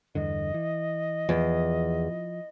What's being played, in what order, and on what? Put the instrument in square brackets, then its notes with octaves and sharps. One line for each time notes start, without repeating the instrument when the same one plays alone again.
[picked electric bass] E2 G2 D3 [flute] D#5
[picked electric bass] E3
[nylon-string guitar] E2 [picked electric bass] F3